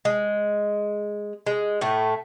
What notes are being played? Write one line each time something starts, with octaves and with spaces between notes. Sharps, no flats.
G#3
G#3
A2 A3